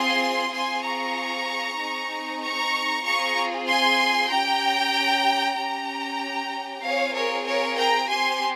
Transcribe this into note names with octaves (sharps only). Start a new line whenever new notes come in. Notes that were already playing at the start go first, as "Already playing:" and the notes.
Already playing: C4 F4 G#4 G#5 C6
C4 F4 G#4 G#5 C6
A#5 C#6
C4 D#4 G#4
A#5 C#6
C4 F4 G#4 A#5 C#6
G#5 C6
C#4 G4 G5 A#5
C#4 G4 G5 A#5
C4 F4 G#4 C#5 F5
A#4 C#5
A#4 C#5
G5 A#5
C4 G4 G#5 C6